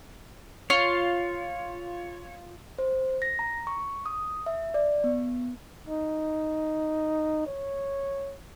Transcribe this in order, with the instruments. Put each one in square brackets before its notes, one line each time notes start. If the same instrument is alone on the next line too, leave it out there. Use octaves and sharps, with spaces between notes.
[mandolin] F4 [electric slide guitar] C#5
[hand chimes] C5
A#6
A#5
C#6
D#6
E5
D5
B3
[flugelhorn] D#4
C#5